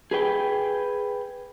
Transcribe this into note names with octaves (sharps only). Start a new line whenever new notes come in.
G#4 B4 G5